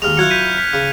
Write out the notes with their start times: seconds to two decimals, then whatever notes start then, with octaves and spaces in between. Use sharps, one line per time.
0.02 D#2 G#3 F6 F7
0.17 F#3 E4 F4 F#6 G#6 C#7
0.30 G6 B6 D#7
0.58 B6
0.73 C#3